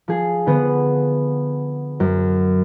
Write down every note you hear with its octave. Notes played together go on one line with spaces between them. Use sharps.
F3 G#4
D3 B3 F#5
F#2